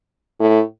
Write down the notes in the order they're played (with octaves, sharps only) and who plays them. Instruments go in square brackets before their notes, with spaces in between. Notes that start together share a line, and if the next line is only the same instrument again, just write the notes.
[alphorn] A2